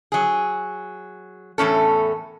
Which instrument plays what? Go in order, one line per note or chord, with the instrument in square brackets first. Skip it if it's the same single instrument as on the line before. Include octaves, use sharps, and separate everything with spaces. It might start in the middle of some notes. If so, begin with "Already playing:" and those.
[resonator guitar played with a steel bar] F#3 G#4
E2 A2 C#4 A4